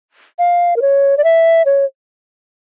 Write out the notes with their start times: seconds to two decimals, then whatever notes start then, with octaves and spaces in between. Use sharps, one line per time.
0.39 F5
0.76 A#4
0.82 C#5
1.17 D5
1.24 E5
1.65 C#5